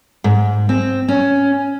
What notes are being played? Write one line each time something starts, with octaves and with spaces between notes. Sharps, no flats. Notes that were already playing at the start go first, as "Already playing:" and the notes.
G#2
C4
C#4